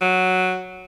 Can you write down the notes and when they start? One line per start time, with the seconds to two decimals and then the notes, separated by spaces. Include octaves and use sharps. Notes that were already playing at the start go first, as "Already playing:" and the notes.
0.02 F#3